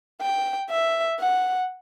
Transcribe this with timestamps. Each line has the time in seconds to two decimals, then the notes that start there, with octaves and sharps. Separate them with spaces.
0.21 G5
0.70 E5
1.20 F#5